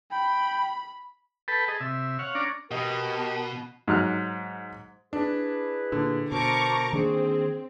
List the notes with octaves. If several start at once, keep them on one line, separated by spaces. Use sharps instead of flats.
G5 B5
A4 B4 G5 A5 B5
G#4 D#5 A5
C3 E5
C#5 F5 F#5
C#4 D4 D5 A#5
B2 G4 A#4 D#5
G#2 F#3 F6 F#6
D4 E4 G#4 B4
A#2 D3
B2 A#4 C5 A5 A#5 C#6 D6
D#3 A#3 C4 D4 G#4